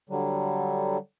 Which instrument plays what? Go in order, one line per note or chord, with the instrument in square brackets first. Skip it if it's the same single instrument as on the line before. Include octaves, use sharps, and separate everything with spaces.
[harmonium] D3 F#3 G3